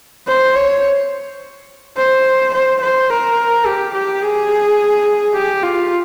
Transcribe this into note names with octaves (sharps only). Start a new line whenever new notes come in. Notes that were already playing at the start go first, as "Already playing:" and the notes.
C5
C#5
C5
C5
C5
A#4
G4
G4
G#4
G4
F4